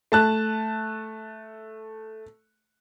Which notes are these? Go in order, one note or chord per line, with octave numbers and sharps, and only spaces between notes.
A3 A5 F#6